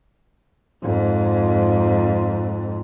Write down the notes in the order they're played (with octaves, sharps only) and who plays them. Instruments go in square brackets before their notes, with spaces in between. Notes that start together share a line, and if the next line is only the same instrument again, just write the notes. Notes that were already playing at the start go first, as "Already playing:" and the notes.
[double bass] F2 G#2